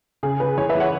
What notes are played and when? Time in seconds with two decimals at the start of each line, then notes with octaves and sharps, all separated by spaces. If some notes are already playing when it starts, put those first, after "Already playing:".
0.23 C#3 G#4
0.40 C#3 B4
0.57 E3 G#4 C#5
0.69 B4 E5
0.75 E3
0.80 C#5 F#5